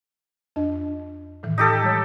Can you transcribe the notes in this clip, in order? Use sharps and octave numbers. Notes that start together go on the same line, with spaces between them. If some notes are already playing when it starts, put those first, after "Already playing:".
F2 D4 D#5
A2 D#3 E3
D#4 G4 A4
G3 G#3 C#5